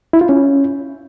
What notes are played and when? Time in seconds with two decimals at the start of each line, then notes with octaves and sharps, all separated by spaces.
0.13 E4
0.21 F4
0.29 C#4